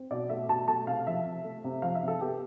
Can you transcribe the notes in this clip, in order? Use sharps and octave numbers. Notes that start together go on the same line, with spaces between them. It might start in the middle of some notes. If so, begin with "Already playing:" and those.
Already playing: C4
B2 D5
A3 E5
B2 A5
A3 A5
C3 F5
F3 E5
C3
A3
C3
F3 F5
E5
C3
A4
B3 G4